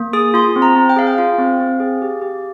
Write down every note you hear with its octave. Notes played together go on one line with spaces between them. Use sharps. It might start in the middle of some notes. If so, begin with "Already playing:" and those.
Already playing: A#3
G#4 D#6
F4 C6
C4
A#5
C4
G5
G#4 F5
G5
F4 F5
C4
C4
G#4
G4
G4